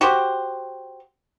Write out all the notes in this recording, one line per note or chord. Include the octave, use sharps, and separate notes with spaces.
F#4 G4 C5